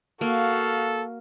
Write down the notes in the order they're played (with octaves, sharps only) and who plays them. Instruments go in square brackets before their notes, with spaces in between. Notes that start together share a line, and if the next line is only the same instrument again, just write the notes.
[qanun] A#3 [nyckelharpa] F#4 F5 [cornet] A4